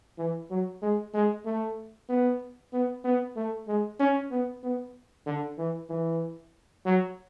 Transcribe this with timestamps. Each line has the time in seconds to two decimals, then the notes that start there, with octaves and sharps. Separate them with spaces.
0.18 E3
0.50 F#3
0.82 G#3
1.14 G#3
1.45 A3
2.09 B3
2.73 B3
3.04 B3
3.36 A3
3.68 G#3
4.00 C#4
4.31 B3
4.63 B3
5.26 D3
5.58 E3
5.90 E3
6.86 F#3